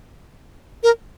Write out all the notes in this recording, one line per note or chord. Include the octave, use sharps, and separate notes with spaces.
A#4